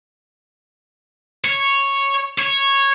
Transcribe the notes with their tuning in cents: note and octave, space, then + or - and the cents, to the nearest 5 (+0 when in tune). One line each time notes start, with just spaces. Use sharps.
C#5 -5
C#5 -10